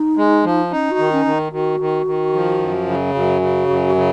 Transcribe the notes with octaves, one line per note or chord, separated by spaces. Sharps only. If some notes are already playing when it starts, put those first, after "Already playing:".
Already playing: D#4
G#3
F3
C#4 D#4
F#4
D#3
C#4
D#3
D#3 F#4
D#3
D#3
F3
F#2
C#3
F#2 F#4
C#3
F#2
C#3